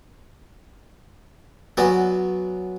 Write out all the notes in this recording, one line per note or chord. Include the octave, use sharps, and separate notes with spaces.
F#3 B3 C#4 F#4 D5